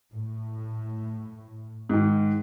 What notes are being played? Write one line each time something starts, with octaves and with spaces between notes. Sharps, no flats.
A2
G#2 D#3